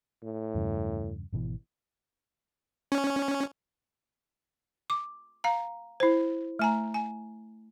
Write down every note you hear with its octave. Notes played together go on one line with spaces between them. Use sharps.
A2
E2 G2 C#3
G#1 B2 E3
C#4
D6
F5 A#5
E4 C5
A3 G#5 A#5
G#5